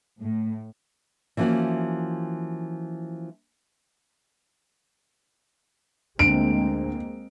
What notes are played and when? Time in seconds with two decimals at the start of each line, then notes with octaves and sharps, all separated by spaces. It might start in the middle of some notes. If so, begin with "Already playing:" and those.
0.20 A2
1.37 E3 F3 A#3 C#4 F#4
6.19 D2 G#3 A#3 C4 D7